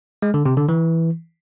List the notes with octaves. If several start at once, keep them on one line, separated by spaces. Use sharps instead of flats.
G#3
D3
C3
D3
E3